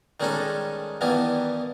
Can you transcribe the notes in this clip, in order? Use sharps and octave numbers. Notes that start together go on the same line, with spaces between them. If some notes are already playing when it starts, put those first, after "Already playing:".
D#3 G3 G#3 C#4 D#4 A4
G2 D#3 E3 G3 B3 E4